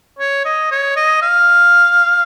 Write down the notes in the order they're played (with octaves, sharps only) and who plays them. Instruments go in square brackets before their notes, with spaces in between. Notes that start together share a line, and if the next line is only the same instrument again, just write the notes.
[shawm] C#5
D#5
C#5
D#5
F5